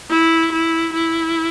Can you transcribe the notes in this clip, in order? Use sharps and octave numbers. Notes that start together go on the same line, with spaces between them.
E4
E4
E4